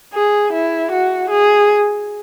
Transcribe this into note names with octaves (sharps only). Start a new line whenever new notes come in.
G#4
E4
F#4
G#4